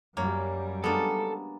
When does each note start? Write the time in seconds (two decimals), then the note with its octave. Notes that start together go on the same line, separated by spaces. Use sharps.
0.17 F#2 F#3 G3 A#3 C#5
0.84 G#3 A#3 B3 D4 A4